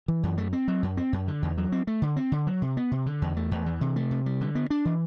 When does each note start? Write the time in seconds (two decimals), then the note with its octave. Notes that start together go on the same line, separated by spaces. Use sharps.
0.08 E3
0.23 F#2
0.38 A3
0.53 C4
0.68 F#3
0.83 F#2
0.97 C4
1.13 F#2
1.28 D3
1.42 E2
1.57 F#3
1.72 C4
1.87 A3
2.02 D3
2.16 C4
2.32 D3
2.47 F#3
2.62 C3
2.77 B3
2.91 C3
3.06 D3
3.22 E2
3.37 A3
3.51 E2
3.66 E3
3.81 C3
3.96 A3
4.11 C3
4.26 G3
4.41 D3
4.55 B3
4.70 D4
4.85 E3